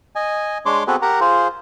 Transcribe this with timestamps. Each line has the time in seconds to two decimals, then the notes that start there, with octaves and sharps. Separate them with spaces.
0.16 D#5 G#5
0.66 G#3 D4 C#5 C6 D6
0.87 B3 C4 F#4 G#4 A4 B4
1.02 G4 A#4 F#5 A#5
1.21 F4 G#4 C5